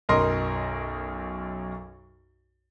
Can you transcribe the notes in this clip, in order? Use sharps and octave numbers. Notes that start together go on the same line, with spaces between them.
B1 F#2 A#4 D#5 C6